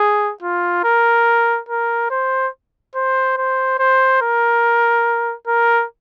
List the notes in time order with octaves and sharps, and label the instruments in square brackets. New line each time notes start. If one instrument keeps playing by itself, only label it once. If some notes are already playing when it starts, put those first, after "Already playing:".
Already playing: [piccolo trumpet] G#4
F4
A#4
A#4
C5
C5
C5
C5
A#4
A#4